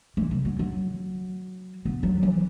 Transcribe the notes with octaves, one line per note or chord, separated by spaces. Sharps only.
E3
C#3
F#3
F#3
B3
F#3
E3